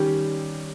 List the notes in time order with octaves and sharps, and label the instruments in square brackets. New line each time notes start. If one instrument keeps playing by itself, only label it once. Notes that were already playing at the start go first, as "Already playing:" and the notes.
Already playing: [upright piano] D#3 [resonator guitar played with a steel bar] G3 C#4 G4